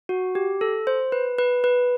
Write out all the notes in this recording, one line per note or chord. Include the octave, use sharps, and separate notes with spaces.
F#4
G4
A4
C5
B4
B4
B4